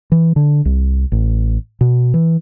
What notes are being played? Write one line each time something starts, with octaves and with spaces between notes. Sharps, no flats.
E3
D3
C2
A1
B2
E3